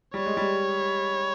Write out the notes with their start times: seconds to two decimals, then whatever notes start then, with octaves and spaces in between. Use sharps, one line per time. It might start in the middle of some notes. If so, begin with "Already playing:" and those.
0.14 G3 C#5
0.26 G#3
0.37 G3